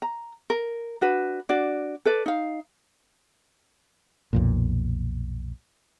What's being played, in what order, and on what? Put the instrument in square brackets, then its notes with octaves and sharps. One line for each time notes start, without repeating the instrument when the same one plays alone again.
[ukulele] A#5
A#4
D4 F#4 B4
D4 F#4 D5
A4 B4 D5
D#4 F5
[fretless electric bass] B1 F2 A#2